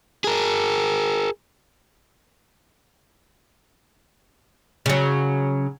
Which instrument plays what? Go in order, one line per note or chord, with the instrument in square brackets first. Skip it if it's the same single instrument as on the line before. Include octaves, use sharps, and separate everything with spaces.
[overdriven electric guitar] G#4 A#4
[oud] C#3 F#3